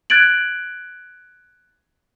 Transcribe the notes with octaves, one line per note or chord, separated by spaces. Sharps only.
F#6 G#6 A6 D7 F#7